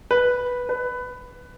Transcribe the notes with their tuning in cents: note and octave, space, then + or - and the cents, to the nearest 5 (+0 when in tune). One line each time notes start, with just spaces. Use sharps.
B4 -5
B4 +15